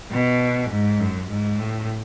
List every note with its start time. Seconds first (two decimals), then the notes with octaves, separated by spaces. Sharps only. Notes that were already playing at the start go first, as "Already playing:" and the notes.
0.11 B2
0.70 G#2
1.00 F#2
1.30 G#2
1.59 A2